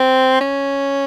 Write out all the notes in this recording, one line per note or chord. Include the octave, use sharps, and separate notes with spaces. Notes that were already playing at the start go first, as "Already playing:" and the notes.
Already playing: C4
C#4